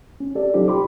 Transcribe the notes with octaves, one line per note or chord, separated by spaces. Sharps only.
C#4
C#4 G4 A4 D5
F#3 C#4 D#4 F4 G4 C5
G5 B5 C6 D6